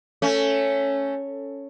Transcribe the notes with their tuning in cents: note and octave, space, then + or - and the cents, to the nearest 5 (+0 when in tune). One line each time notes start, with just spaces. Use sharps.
A3 +10 C#4 +0